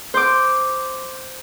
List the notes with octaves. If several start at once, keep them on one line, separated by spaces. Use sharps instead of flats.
C5 D6